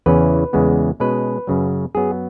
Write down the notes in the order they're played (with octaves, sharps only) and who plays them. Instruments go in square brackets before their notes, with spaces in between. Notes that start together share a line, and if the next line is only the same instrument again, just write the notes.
[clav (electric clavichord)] E2 C#3 E3 C#4 B4
E2 C#3 G#3 B3
B2 G#3 C#4 B4
F#2 C#3 F#3
F#2 F#3 B3 G#4